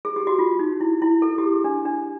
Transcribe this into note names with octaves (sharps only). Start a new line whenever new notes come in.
G#4
G4
F#4
F4
D#4
E4
E4
A4
G4
G#4
D4
D4